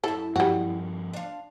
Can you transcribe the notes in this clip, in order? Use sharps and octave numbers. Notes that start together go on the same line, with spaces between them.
F#2 E4 A4
G2 F3 G3 F#4
D4 F4